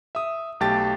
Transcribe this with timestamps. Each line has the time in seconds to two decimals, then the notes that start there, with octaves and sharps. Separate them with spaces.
0.15 E5 D#6
0.60 B1 A3 G4 G5 A5 A6